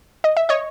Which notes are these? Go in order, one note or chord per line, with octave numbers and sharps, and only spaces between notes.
D#5
E5
C#5 D#5